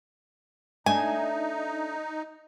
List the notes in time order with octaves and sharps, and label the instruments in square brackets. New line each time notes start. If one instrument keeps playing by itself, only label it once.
[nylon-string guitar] A3 D4 [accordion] D#4 [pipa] G#5